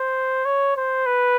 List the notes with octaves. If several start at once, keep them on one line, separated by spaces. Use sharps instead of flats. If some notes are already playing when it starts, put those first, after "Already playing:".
Already playing: C5
C#5
C5
B4